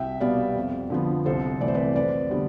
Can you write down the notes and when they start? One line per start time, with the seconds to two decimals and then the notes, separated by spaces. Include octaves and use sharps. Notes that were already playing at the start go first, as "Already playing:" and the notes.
Already playing: C2 E5 G5
0.21 B2 G3 B3 D5 F5
0.55 F2
0.90 D3 F3 B3
1.26 C2 A4 C5
1.61 C3 E3 A3 D5
1.68 C5
1.74 B4 D5
1.95 F2 B4 D5
2.30 D3 G3 B3